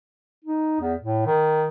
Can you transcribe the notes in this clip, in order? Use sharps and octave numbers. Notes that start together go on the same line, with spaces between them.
D#4
E2
A2
D#3